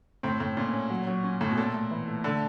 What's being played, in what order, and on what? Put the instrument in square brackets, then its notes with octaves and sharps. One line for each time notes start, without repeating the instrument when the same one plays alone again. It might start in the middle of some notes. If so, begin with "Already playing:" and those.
[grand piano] A2 [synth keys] C4
[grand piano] A2 [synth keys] C4
[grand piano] A#2 [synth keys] C#4
[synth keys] C#4
F#3
F#3
C#4
[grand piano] A2 [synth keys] C#4
[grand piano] B2
[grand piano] A#2 [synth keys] A4
[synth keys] A3
E3
A3
[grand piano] D3 [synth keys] A3